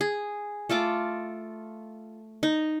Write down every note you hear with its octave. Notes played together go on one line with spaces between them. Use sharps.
G#4
A3 F4 A4 D6
D#4